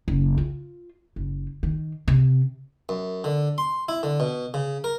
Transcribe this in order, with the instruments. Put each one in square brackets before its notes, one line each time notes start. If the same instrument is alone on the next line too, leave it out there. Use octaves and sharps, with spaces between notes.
[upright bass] F#1
F4
F#1
D#3
C3
[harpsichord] F#2
D3
C6
E4
D3
B2
C#3
A#4